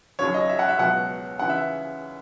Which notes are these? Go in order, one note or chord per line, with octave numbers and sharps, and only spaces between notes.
D#2 C#3 F#3 C#5
D#5
E5
F#5
E5
C#2 B2 F#3 F#5
D#2 C#3 E3 F#5
E5